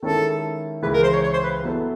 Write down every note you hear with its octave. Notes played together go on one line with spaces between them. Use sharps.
D#3 G#3 C#4 E4 A4
C#2 C#3 E3 G#3 B4
A#4
C5
C#5
C#5
C5
B4
F#3 B3 E4 A4